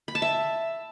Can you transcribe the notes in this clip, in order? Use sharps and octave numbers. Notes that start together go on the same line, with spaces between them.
B5
A5
E5